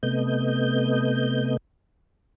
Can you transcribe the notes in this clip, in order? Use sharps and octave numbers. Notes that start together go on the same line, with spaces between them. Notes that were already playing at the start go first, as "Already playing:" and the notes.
C3 A3 B3 D#5 G6